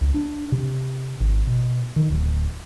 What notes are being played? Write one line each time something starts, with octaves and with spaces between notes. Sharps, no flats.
C#2
D4
C3
G#1
B2
D#3
D1